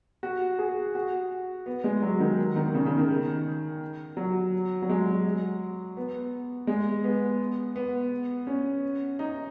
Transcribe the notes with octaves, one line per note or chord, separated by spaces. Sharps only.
F#4
G#4
F#4
B3
G#3
F#3
D#3
D#3
C#3
C#3
D#3
F#3
F#3
G#3
F#3
B3
G#3
B3
B3
C#4
D#4